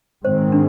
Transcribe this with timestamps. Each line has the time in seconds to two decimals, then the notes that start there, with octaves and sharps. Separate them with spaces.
0.24 G#2 D#3 G#3 C4 C5
0.52 D4